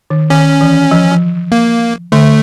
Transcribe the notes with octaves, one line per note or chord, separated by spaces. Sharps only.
D#3
D#3 C#4
E3
F3
F3
A#3
D3 A3